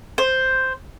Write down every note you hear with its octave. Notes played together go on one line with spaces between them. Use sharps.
C5